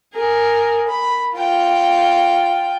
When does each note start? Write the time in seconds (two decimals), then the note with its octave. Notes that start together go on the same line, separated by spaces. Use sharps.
0.14 G#4 A#4
0.89 B5
1.36 F4 G5